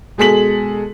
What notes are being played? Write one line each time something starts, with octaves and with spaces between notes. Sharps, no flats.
B2 G#3 G#4 A4 B6 F#7